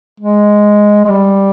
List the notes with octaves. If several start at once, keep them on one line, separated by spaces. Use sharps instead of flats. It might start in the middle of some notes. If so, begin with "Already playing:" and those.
G#3
G#3
G3